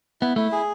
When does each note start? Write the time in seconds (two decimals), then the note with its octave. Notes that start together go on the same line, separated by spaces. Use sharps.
0.21 B3 E4
0.36 A3 E4
0.52 G#4